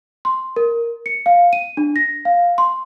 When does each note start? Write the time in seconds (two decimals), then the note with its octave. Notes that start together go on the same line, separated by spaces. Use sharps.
0.25 C6
0.56 A#4
1.06 C#7
1.26 F5
1.53 D#7
1.77 D4
1.96 A#6
2.25 F5
2.58 C6